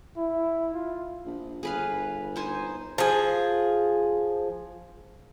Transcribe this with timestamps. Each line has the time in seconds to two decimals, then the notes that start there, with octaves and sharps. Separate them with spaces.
0.17 E4
0.74 F4
1.26 A#1
1.63 G1 G#4 B4 F5
2.36 D#4 C5 G#5
2.98 F3 G#4